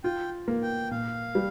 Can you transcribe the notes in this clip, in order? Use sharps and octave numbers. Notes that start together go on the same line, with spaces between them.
F4 G5
A#3
G5
A#2 F5
G3